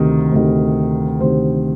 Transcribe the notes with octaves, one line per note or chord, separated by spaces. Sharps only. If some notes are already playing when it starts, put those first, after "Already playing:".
Already playing: D2 C3 D#3
D2 C3 D#3
D2 C3 D#3 C5